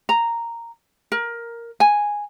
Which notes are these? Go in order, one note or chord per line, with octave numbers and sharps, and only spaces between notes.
A#5
A#4
G#5